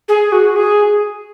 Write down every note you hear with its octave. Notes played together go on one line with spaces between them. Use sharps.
G#4
F#4
G#4